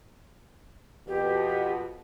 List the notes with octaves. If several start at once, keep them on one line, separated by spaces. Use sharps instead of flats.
F2 B2 G4